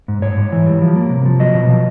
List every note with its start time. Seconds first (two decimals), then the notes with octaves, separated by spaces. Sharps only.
0.08 G#2
0.22 G#2 C#5
0.37 G#2
0.52 E3
0.67 G3
0.82 F3
0.96 A#3
1.10 C3
1.26 F3
1.39 F#3 D#5
1.54 B2
1.69 F3